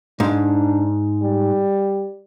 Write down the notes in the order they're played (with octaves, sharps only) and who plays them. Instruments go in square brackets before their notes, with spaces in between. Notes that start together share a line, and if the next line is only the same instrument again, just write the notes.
[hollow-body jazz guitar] G#2 [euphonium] D4
[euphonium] G3